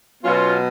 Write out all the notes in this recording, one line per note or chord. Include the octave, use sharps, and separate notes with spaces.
B2 F#3 B3 C#4 F4